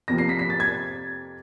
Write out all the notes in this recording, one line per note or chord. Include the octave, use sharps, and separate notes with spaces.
F2 C3 F3 A#3 A#6
C7
B6
B6
A6
G#6